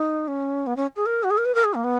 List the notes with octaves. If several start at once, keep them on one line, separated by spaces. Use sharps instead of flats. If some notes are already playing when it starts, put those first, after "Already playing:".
Already playing: D#4
C#4
B3
C#4
G#4
A#4
F#4
G#4
A#4
B4
A#4
G#4
A#3
B3